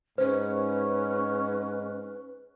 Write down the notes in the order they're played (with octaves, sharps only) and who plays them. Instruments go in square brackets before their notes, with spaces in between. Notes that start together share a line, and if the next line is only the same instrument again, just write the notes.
[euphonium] G#2 [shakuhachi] C#4 [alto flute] B4 [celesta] C5